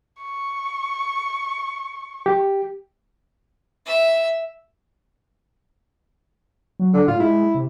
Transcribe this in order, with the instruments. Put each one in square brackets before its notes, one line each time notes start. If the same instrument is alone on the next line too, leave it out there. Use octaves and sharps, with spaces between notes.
[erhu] C#6
[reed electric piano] G4
[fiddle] E5
[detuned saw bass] F#3
[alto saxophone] D3
[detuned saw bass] A2 [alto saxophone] F4
[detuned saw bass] G#3 [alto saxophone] E4
[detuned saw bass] C3